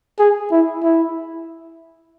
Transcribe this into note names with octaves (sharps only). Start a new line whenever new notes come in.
G#4
E4
E4